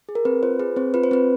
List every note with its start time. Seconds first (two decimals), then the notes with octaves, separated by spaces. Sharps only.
0.09 G#4
0.15 A#4
0.25 C4 B4
0.43 F4 C5
0.60 G#4 B4
0.76 C4 C5
0.94 F4 B4
1.04 C5
1.11 C4 B4